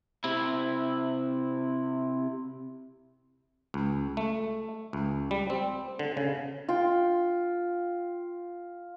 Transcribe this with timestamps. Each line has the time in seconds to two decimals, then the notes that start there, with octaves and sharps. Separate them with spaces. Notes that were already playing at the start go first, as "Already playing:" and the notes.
0.24 C3 E4
3.74 C#2
4.17 A3
4.93 C#2
5.31 G3
5.50 C4
5.99 D3
6.17 C#3
6.69 F4 G5